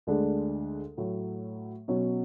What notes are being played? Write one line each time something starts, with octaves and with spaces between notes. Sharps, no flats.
D2 D3 G#3 D4
A2 F#3 A3
B2 F#3 C#4